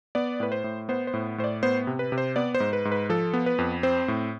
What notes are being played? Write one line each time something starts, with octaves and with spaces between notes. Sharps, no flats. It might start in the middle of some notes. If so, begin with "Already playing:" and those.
B3 D5
A2 B4
C5
A2
B3 C5
C5
A2
A2 C5
D5
B3 C5
C3
B4
C3
C5
B3 D5
C5
G#2
B4
G#2
B4
F3 A4
B3
B4
F2
C4 C5
A2